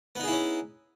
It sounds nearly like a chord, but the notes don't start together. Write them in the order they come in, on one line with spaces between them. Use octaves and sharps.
B3 D#4 G#4 E4 C#4